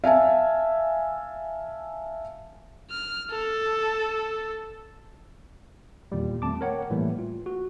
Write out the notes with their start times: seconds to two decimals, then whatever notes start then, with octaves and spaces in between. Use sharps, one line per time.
0.04 E5 F5 G#5 A5
2.92 F6
3.31 A4
6.12 E2 A#2 D#3 G3
6.42 D#3 A3 C4 A5 D6
6.61 A#4 C#5 F#5 G5
6.90 A2 E3 G3 A3 A#3
7.19 F4
7.46 F#4